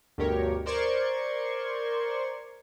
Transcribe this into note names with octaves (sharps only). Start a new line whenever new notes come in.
D2 G2 B2 G4 A#4 C#5
A#4 C5 D5 C6 C#6 G#6